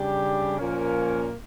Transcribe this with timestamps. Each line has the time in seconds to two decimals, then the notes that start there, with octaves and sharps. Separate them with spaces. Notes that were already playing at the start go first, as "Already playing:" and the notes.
Already playing: C#3 G3 D4 G4
0.59 A#2 F3 A#3 C#4